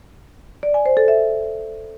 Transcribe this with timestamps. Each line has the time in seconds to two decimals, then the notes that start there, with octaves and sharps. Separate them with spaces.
0.63 D5
0.74 G#5
0.86 C5
0.97 A4
1.08 E5